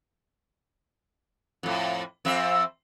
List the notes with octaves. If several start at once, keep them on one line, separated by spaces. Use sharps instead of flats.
F2 A2
F2 C4 E5